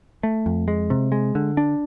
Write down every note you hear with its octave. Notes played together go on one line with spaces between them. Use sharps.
A3
F2
G#3
C3
G#3
D3
D4